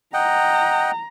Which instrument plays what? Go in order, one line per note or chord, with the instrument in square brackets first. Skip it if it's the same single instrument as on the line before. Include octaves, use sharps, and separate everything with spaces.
[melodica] D#5 F#5 G5 [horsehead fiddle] A#5